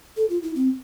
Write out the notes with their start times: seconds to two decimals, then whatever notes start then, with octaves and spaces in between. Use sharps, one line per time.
0.17 A4
0.30 F4
0.42 E4
0.55 C4